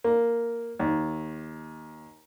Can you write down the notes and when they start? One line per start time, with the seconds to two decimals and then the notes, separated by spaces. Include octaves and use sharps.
0.04 A#3
0.79 D#2